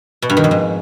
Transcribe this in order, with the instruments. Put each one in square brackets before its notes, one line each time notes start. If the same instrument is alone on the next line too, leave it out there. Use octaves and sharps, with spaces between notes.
[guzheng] B2
G2
D#3
F2
G#2